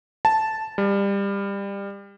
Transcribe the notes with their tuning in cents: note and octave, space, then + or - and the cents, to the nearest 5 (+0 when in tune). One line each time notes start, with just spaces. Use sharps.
A5 -5
G3 +25